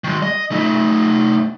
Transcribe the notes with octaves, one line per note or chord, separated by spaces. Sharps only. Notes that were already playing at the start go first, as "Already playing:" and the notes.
D#3 G#3
D#5
A3 D#4